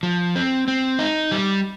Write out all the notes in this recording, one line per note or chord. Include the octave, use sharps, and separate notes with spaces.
F3
C4
C4
D#4
G3